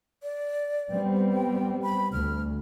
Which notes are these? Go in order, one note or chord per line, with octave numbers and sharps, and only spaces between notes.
D5
G3 B3 C4
G5
B5
D2 F6